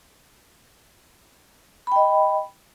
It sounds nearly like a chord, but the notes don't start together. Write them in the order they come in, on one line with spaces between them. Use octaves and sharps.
B5 G5 D#5